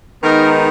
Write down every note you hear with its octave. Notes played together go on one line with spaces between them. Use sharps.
D#3 G#3 B3 D#4 A#4